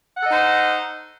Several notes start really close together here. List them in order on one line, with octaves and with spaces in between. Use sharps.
F#5 A4 D#5 D#4 C5